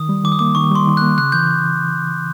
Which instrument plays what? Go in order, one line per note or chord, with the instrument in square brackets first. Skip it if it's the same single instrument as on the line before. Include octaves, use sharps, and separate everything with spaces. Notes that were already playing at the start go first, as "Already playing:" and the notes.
Already playing: [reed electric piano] D#3 [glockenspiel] D#6
[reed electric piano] G3
[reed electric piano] D#3 [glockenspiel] D6
[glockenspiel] D#6
[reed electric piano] A#3 [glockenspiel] D6
[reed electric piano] D#3 [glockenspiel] C#6
[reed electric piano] G3 [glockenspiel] C6
[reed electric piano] D#3
[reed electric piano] A#3 [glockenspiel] F#6
[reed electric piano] C#3 [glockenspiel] F#6
[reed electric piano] E3 [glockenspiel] G6